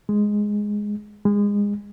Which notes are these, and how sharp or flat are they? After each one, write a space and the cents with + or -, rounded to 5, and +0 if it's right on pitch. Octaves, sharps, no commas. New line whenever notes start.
G#3 +0
G#3 -25